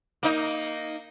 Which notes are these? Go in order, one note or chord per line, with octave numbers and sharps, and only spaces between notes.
A#3 D#4